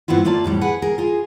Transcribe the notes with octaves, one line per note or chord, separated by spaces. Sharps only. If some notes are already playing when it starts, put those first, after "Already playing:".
G2 B3 C4 E4 F4
A3 A#3 F4 D5 A5
F2 A2 G3 A#3
G#4 B4 F#5
G#4 A#4
F4 G#4